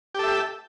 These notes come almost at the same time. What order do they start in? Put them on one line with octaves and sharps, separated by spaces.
G4 A4 E5